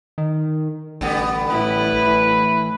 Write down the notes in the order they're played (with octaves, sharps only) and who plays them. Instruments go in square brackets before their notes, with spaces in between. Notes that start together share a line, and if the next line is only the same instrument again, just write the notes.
[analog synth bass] D#3
[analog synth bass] A1 [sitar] D3 G3 B3
[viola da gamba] A2 A3 E4 [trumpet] B4
[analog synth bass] E3